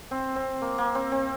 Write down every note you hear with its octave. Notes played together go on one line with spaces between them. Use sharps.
C4
C4
A#3
A#3
C4
C4